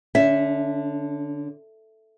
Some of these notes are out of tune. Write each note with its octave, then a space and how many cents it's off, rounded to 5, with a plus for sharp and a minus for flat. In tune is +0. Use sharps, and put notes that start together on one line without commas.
D3 +0 C#4 +30 E5 +0